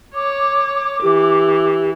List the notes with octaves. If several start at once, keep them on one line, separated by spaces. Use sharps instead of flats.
C#5 D6
E3 G4